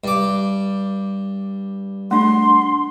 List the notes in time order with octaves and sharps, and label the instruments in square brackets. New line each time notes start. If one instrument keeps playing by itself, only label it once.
[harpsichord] G2 D6
[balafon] A3 D4 [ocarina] C6